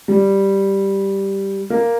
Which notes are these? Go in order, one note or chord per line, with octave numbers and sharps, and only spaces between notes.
G3
A#3